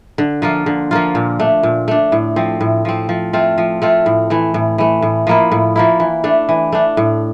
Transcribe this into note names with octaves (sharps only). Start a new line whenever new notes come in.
D3
F3 A#3 F4
D3
F3 A#3 F4
A#2
A3 D4
A#2
A3 D4
A2
F3 C4
A2
F3 C4
F3
A3 C4 F4
F3
A3 C4 F4
A2
E3 A3
A2
E3 A3
A2
F3 A#3 E4
A2
F3 A#3 E4
E3
A3 D4
E3
A3 D4
A2